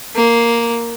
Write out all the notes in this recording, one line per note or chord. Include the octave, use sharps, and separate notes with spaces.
A#3